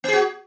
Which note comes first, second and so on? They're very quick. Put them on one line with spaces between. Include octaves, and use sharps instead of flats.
B3 G#4 F#4